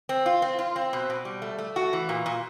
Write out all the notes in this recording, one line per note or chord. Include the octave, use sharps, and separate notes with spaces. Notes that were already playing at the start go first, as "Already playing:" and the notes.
C4
F4
C4
F4
C4
B2
B2
G3
A3
A3
F#4
E3
A#2
A#2